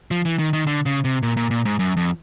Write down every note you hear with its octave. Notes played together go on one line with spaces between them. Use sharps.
F3
E3
D#3
D#3
D3
C#3
C3
A#2
A#2
A#2
G#2
F#2
F2